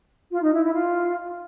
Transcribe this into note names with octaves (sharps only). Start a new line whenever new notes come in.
F4
D#4
E4
E4
F4